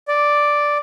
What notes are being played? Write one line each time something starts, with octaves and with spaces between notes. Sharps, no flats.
D5